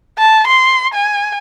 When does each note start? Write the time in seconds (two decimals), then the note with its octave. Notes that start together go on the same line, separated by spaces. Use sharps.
0.19 A5
0.47 C6
0.94 G#5